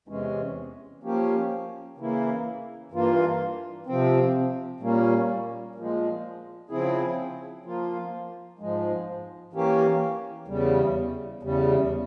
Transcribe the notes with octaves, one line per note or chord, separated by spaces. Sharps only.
E2 C3 E3 G#3 C#4
F3 A#3 C#4 G4
C#3 E3 A#3 E4
G2 E3 A#3 F4
C3 F3 C4
A#2 G3 A#3 C#4
A#2 F3 G#3
C#3 F3 C4 E4 G#4
F3 A#3 F4
G#2 F3 G#3
E3 A#3 C#4 G4
E2 C#3 G3
E2 C#3 G3